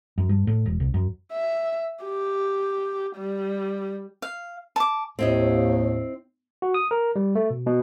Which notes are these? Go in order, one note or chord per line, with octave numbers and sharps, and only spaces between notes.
F#2
G2
A2
E1
C2
F#2
E5
G4
G3
F5
A5 D6
D#2 A2 C4 E4 D#5
F#4
D#6
A#4
G3
A3
B2
B2